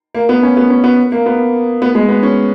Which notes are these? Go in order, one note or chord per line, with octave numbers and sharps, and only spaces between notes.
A#3
B3
C#4
B3
C#4
B3
A#3
B3
B3
G#3
B3
C#4